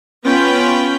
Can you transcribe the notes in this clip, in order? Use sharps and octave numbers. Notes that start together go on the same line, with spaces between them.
B3 C#4 F4 G5 B5